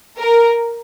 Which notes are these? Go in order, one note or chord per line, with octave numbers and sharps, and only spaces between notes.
A#4